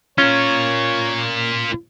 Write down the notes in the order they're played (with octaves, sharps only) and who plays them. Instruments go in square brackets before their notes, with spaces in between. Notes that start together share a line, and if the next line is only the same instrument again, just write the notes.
[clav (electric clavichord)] C#4 [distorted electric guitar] F4 A#4 [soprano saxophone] C#5